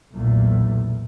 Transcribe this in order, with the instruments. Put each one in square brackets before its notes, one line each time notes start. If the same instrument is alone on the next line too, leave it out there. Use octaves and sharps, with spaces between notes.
[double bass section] B1 E2 A#2 A3